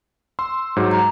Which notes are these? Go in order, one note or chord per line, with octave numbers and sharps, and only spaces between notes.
C6 E6
G#2 F#3
A#5